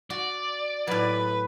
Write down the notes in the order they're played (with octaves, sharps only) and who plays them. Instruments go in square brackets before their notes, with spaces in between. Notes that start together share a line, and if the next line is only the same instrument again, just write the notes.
[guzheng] F#4 [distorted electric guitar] D5
[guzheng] A2 F#3 [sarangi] B4